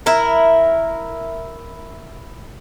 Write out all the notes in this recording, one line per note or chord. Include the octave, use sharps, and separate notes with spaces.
E4 A#4